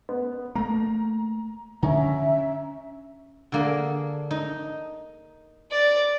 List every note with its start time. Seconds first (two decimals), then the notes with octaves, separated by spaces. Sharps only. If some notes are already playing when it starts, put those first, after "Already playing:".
0.09 B3
0.55 A3 A#3 A#5
1.83 D3 C#4 E5 A#5
3.52 D3 A#3 G#4
4.31 D#4
5.71 D5